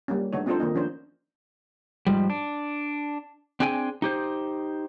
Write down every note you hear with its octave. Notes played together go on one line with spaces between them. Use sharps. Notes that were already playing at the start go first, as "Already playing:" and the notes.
G3 A#3 C#4
D3 A3 D#4 C#5
C4 D4 D#4 F4 A4 C5
D#3 A#3 D#4
F3 C#4 D4 C5
G#2 C3 F3 G3
D4
C4 D4 G#4 G5 G#5
D#4 G4 C5